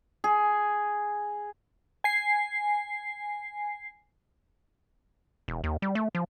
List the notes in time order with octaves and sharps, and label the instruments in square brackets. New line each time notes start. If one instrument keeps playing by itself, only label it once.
[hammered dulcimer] G#4
[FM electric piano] G#5 C7
[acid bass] E1
D#2
G3
A3
F3